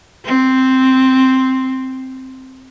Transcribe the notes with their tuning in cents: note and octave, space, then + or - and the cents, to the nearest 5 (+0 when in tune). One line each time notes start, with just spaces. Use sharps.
C4 +0